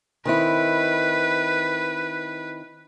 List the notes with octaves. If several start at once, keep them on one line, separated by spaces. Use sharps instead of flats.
D#3 C4 E4 B4